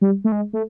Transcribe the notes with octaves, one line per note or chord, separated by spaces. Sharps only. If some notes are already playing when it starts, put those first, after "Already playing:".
G3
A3
G#3
A3